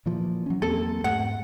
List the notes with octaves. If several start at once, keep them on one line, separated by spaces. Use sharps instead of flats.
A#2 E3 F3
F#3 C#4
E2 A#3 C4 A4
G#2 A3 F#5